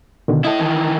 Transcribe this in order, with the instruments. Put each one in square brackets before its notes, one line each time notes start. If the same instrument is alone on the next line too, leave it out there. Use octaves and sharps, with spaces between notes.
[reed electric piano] B2 D3 D#3
[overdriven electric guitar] E4 A4 [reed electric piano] D#5
[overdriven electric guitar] D#3 E3